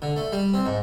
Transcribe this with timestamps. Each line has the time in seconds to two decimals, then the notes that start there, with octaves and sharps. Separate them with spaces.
0.02 D3
0.16 A3
0.32 G3
0.54 C4
0.66 G#2